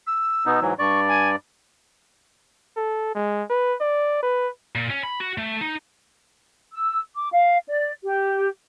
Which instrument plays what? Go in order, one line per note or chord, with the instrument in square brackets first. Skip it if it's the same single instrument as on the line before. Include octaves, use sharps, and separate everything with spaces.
[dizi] E6
[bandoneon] B2 B3 D#4
G#2 E3 F#3
[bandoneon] G2 D5 [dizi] C#6
[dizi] G#5
[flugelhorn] A4
G#3
B4
D5
B4
[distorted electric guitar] A#2
C#4
B5
F#4
A3
D#4
[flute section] E6
D6
F5
D5
G4